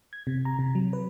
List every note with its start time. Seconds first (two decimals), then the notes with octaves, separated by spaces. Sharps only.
0.13 G#6
0.27 C3
0.45 A#5
0.59 C3
0.75 F#3
0.93 B4